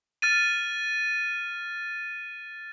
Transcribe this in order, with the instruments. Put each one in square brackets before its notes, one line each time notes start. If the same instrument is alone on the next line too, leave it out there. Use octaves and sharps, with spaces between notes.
[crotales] F6 A6 D#7